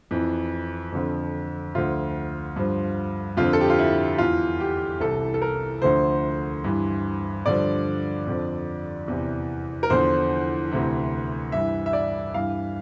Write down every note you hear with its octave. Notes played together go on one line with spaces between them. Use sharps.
F2 E3
F2 D3 F3
D2 D3 F3 F4
G2 F3
F2 D3 F3 F4
A4
G4
F4
E4
E2 E3 F4
G4
C2 C3 E3 A4
A4
A#4
D2 D3 F3 C5
G2 E3
G2 D3 F3 D5
F2 D3 F3
E2 C3 E3
A#4
E2 D3 F3 C5
D2 C3 E3
G2 E3 E5
E5
D5
G2 E3 F5